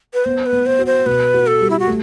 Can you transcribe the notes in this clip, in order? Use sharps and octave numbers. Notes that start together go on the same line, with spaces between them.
B4
B3 C5
B4
B3
C5
F#4
C5
B2 B4
F#4
A4
G3
E4
F#4
A3